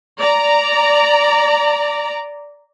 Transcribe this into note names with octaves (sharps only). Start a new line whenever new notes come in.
D5 A#5